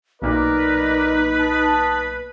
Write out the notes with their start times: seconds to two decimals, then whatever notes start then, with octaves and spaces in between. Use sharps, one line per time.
0.22 B1 A#2 D#4 A#4 B4 D5
1.39 D#5 A5